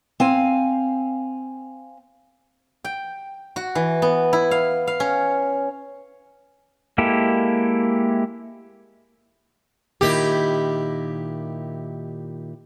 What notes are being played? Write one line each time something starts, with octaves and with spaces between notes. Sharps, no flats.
C4 F5 G#5
G5
F#4
E3
B3
E4
F5
F5
C#4
G#3 A#3 E4 G4 A4
A#2 D#3 E4 G4